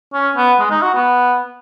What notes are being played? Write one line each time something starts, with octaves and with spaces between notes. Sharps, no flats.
C#4
B3
G#3
D#4
F#4
B3